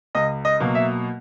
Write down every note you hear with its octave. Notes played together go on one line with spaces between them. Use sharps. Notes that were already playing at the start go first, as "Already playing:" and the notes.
C#2 D#5
D#5
B2 F#3 A#3
E5